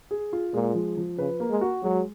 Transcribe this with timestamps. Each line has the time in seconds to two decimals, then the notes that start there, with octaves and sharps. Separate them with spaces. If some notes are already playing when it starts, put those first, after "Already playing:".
0.11 G#4
0.33 F4
0.54 A#2 G#3
0.75 F3
0.97 F3
1.18 C#3 B4
1.40 A#3
1.50 G#3
1.61 F#4
1.83 F#3 G#3